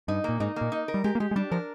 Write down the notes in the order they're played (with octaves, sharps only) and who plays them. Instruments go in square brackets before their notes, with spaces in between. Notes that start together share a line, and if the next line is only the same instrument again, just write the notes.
[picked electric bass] G2 [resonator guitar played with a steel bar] D#4
[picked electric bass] A#2 [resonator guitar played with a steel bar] A#3
[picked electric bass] G#2 [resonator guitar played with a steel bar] D#4
[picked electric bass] A#2 [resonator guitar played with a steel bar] A#3
[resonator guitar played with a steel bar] D#4
A#4
[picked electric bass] G3
[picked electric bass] G#3 [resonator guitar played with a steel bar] G4
[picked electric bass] A#3
[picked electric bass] G#3 [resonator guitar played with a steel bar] G4
[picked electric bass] G#3
[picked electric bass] G3 [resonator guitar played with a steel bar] D4
[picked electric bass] F3 [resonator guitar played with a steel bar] A#4